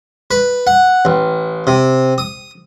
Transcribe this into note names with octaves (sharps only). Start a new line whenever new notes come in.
B4
F#5
A1
C3
D#6